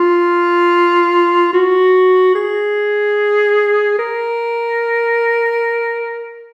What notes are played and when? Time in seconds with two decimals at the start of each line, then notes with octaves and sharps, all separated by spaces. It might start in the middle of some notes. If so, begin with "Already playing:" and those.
Already playing: F4
1.53 F#4
2.35 G#4
3.99 A#4